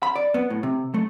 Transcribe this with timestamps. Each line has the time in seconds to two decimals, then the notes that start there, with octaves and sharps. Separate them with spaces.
0.03 B5
0.16 D5
0.34 B3
0.50 A2
0.63 C3
0.94 A3